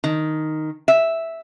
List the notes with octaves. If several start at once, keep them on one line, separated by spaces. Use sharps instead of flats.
D#3
E5